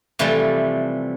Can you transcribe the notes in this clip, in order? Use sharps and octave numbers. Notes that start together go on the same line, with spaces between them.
C3 E3 F3 G3 A3